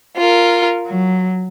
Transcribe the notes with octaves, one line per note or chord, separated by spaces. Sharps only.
F4 A#4
F#3